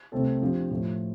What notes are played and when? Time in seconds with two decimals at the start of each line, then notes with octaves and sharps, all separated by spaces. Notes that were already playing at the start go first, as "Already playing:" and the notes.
0.12 C2 C3 A3 C4 A4
0.41 F2 F3 D4 G4
0.71 A2 F3 A3